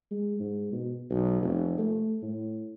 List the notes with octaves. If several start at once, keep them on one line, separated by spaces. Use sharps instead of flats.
G#3
G#2
B2
B1
F1
A3
A2